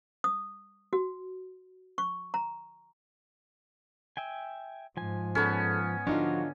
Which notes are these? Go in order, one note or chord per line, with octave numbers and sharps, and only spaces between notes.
D#6
F#4
C#6
A#5
E5 G5 G#5
G#2 F3 G#5
B3 C#4 G#4 A4
D3 F3 D4 D#4 F4 F#4 F5